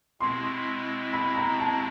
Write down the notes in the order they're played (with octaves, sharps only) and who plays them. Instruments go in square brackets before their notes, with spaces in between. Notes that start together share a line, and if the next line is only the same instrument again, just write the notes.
[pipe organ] B2 G#3 C4 E4 [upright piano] C6
[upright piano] B5
A#5
A5